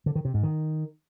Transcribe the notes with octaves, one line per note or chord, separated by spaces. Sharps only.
D3
D#3
C3
G#2
D#3